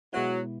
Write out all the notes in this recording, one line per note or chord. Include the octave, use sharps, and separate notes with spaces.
B2 F#3 G#3 B3 E4